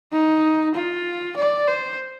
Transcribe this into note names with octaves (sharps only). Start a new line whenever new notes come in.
D#4
F4
D5
C5